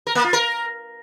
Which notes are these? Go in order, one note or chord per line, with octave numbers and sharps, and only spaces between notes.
A#4
A#3
F4
A#4